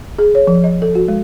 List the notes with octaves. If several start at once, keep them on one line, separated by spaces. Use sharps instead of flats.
G#4
C#5
F3
D#5
A4
F#4
G#3